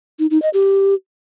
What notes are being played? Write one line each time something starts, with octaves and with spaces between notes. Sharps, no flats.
D#4
D#4
D#5
G4